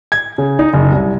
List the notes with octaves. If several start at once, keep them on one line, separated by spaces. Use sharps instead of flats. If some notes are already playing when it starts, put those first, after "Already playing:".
G#6
C#3
D#4
F#1
C2